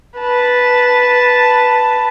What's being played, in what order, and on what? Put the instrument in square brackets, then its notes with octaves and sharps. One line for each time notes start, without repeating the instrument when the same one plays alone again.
[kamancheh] B4 A5